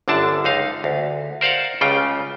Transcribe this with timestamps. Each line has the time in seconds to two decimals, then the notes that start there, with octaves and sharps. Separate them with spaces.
0.08 G1 F#2 D3 D4 A5
0.44 C#2 D#4 F5
0.84 D2
1.41 A#4 C5 D5 F5 F#5
1.81 C#2 C#3 G3 F4 G5